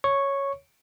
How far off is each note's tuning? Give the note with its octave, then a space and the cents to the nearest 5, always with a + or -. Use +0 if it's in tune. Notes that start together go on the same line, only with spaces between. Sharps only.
C#5 +0 C#6 -5